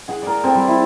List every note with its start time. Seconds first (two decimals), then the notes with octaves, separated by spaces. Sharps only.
0.08 G#4 F#5
0.22 A#4 D5
0.43 C4 A4 G#5
0.55 G3
0.68 E4